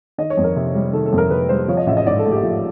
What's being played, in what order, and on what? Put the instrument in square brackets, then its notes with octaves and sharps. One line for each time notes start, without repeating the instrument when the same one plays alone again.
[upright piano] D#3 D#5
C#5
F2
A#4
C3
G3
D#3 A4
A4
F2
A#4
C3 B4
G3 C5
F3 C#5
D#5
A1 E5
D#5
G#2 D5
A4
A3
G4
F3